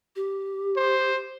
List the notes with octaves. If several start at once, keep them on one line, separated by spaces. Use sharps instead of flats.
G4
C5